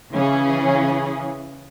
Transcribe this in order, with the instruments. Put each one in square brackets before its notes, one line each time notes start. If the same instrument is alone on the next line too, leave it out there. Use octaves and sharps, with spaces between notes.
[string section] C#3 E3 C#4 G#4